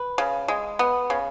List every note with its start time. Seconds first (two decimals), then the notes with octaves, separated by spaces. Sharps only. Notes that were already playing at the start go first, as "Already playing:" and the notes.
Already playing: B4
0.18 C#3
0.48 G#3
0.79 B3
1.10 C#3